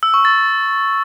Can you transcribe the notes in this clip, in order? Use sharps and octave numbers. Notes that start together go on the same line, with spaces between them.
E6
C#6
A6